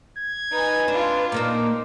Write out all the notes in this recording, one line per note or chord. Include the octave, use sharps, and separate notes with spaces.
G#6
D#4 B4 G#5
C4 D4 F4
A#2 A#3 C4 D4 D#4 D6